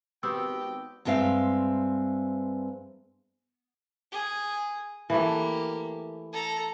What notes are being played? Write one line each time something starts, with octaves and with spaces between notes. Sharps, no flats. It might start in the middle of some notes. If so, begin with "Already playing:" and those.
G#1 B3 C4 F#4 G4 G5 E6
G2 G#3 C4 E5 F5
G#4
E3 A3 A#3 G4
A4 A#5